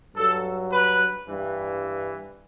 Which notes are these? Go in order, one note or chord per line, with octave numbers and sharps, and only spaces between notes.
G2 F#3 A4
B4
G2 E3